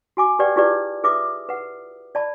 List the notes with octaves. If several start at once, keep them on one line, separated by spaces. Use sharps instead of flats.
F#4 G#5 D6
G4 G#4 B4 D5 F#5 G5
E4 F4 G4 G#4 B4 D5
G#4 B4 E5 D6 D#6
B4 F#5
D5 A5 B5